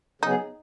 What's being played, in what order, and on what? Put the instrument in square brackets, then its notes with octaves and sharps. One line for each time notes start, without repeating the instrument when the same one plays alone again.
[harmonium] C#3 F#3 B3 G#4 [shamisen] D#4